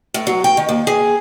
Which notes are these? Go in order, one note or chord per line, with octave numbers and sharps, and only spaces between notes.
A2
F#3
G5
D#3
D#2
G#4